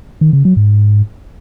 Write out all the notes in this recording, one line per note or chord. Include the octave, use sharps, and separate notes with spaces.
D#3
C#3
F#3
G#2